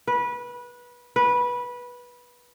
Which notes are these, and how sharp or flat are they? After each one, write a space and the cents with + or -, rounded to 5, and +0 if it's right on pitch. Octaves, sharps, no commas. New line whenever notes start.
B4 -20
B4 -15